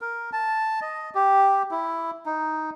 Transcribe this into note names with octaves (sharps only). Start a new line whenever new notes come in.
A#4
A5
D#5
G4
E4
D#4